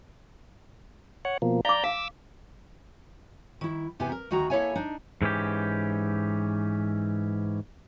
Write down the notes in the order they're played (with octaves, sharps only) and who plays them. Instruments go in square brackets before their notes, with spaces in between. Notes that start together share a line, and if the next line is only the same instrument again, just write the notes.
[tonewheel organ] C#5 F#5
B2 F3 A#3
[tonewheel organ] D5 A#5 G6 [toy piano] F5 D6
[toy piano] F5 [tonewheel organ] D6 E6
[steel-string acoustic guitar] D#3 E4
E2 C3 B3 E4 G4 G#5
A#4
D2 D#3 F#4 G#4 G5 A#5
A#3 E4 A4 C#5 E5 G#5
D4 D#4
[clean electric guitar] G#2 E3 C#4 G4